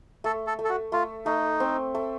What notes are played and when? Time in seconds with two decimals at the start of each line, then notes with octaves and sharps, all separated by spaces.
0.24 A3 A4
0.47 A4
0.59 A3
0.65 A4
0.70 F#4
0.92 A3 F4
1.26 A3 D#4
1.60 C4
1.95 A3